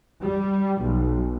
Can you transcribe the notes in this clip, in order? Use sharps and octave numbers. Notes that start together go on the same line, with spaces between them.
G3
B1